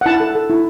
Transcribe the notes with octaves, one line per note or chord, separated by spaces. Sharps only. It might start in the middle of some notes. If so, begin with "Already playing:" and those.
F#5
E4 A5
A4
A4
E4